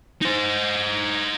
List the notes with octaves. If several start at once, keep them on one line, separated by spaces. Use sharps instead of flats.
D#4 C5